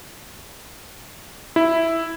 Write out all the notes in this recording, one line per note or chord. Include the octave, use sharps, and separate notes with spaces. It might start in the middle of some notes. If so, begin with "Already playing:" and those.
E4